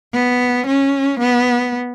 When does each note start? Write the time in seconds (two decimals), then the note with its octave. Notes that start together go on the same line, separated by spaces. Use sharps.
0.13 B3
0.67 C#4
1.19 B3